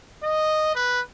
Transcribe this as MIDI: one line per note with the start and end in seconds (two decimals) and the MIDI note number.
0.23 0.73 75
0.75 1.01 71